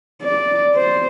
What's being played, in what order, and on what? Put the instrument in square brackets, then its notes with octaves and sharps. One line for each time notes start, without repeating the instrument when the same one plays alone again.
[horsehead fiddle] D5
C5